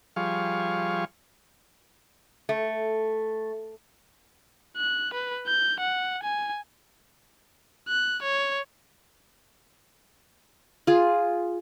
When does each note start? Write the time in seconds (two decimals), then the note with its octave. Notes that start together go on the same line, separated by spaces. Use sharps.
0.16 F3 G3 G#4 F5 C#6
2.49 A3
4.77 F#6
5.14 B4
5.47 G6
5.80 F#5
6.23 G#5
7.89 F#6
8.22 C#5
10.87 F4 G#4